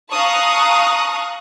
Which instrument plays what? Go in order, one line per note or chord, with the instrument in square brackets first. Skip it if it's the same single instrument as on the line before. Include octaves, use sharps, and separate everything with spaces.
[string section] F5 A5 A#5 C#6 D#6 F#6